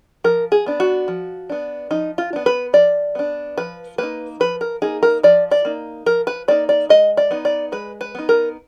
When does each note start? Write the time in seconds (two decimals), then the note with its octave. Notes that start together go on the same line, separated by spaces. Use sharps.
0.24 F3 A#4
0.52 G#4
0.66 B3 D4
0.80 F#4
1.08 F3
1.50 B3 D4
1.91 F3 D#4
2.18 F4
2.33 B3 D4
2.46 B4
2.73 F3 D5
3.15 B3 D4
3.58 F3 B4
3.98 A#3 D#4 B4
4.40 F3 B4
4.61 A#4
4.82 A#3 D#4 G#4
5.03 A#4
5.23 F3 D5
5.51 D5
5.65 A#3 D#4
6.06 F3 A#4
6.27 B4
6.48 A#3 D#4 D5
6.69 D5
6.89 G#3 D#5
7.17 D5
7.31 B3 D#4
7.45 D5
7.72 G#3 B4
8.01 B4
8.15 B3 D#4
8.29 A#4